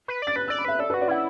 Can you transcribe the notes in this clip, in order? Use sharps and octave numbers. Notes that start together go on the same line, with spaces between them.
B4
D5 A6
B4 F#6
D5 E6
B5
B4 E5
A4 D5
F#4 B4
D5
E4 F#5